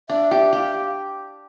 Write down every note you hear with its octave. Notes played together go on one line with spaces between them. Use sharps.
D4 E5
G4 E5
G4 F5